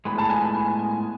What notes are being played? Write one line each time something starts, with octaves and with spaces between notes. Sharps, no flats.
A2 G#3 B3 B5
A5
G#5
B5
G#5
G#5